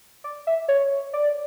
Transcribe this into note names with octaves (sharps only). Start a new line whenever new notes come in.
D5
E5
C#5
D5